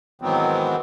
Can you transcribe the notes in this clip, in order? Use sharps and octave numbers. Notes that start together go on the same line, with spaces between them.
G#2 D#3 E3 F#3 B3 C4